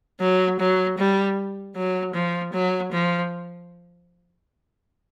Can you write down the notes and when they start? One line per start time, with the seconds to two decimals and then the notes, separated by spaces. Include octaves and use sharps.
0.21 F#3
0.60 F#3
0.99 G3
1.76 F#3
2.14 F3
2.53 F#3
2.93 F3